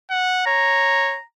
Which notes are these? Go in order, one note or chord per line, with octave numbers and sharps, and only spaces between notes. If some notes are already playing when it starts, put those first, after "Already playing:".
F#5
C#5 A#5